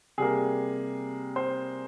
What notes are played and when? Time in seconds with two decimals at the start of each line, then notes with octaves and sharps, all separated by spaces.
0.18 C3 G3 A#3 G#4
1.36 C5